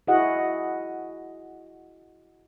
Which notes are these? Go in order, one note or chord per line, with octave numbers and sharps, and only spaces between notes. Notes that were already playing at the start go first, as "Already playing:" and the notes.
E4 F#4 G#4 D#5 F#5